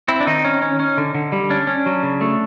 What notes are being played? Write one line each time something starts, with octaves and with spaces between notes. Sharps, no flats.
C4 E4
D4
D#3 D#4
C#4
C#4
C#4
D3
D3
G3
C#4 D4
C#4
F#3
C#3
A3